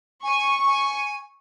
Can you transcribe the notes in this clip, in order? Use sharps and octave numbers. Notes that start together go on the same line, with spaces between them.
G#5 C#6
G#5